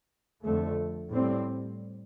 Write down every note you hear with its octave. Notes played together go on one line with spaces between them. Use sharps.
F2 D3 A3
A2 G3 C4